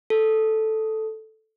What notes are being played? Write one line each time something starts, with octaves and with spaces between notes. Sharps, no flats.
A4